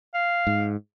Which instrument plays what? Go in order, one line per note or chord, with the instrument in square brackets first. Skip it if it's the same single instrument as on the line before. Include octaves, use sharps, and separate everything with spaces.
[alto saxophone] F5
[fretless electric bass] G#2